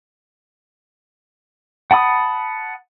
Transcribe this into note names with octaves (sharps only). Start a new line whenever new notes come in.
F#5 A5 B5 D#6